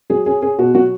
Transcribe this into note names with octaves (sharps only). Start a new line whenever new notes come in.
F#3 G#4
C#4 G#4
C#4 G#4
B2 F#4
F#3 F#4